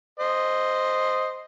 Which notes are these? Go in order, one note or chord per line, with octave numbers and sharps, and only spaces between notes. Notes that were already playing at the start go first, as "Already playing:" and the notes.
C5 D#5